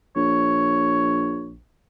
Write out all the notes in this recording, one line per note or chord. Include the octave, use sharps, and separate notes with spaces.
A#1 C#5